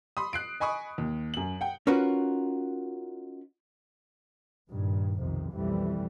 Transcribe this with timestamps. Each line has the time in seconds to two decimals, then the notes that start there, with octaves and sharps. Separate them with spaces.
0.17 B5 C6 D#6
0.33 F#6 C7 D7
0.60 D#5 G#5 B5 C#6 D#6
0.98 D#2
1.34 F#2 F#7
1.61 F#5 G5
1.87 C#4 D#4 F4 F#4 A#4 B4
4.70 G2 A#2 D#3
5.18 B1 F2 C3 D#3
5.53 B1 F2 E3 G3 A3